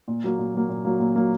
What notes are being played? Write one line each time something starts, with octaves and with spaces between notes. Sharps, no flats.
A#2
F#3 A#3
A#2
F#3 A#3
A#2
F#3 A#3
A#2
F#3 A#3